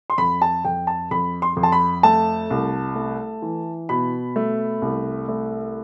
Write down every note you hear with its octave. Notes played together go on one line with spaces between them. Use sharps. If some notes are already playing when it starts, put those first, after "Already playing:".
C6
F2 B5
A5
F2 G5
A5
F2 B5
C6
F2
A5
B5
A3 A5
C2
A3
E3
B2 B5
A3
C2
A3